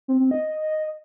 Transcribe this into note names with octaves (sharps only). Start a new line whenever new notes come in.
C4
C4
D#5